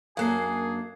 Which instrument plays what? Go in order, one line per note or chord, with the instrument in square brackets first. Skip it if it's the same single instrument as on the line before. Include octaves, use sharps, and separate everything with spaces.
[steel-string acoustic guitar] F#2 A#3 D4 [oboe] G#4 [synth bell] F5 F#6 C7 [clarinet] G#5